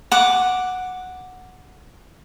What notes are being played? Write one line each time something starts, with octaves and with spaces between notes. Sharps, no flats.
F#5 D6